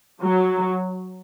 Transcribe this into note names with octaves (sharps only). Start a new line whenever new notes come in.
F#3